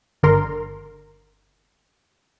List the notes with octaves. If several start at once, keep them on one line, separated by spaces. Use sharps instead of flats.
G1 D3 A#4 C6